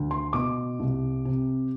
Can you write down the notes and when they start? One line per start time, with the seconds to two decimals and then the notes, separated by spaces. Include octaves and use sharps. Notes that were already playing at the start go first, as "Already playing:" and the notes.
Already playing: D2
0.11 C6
0.33 B2 D6
0.80 C2
1.25 C3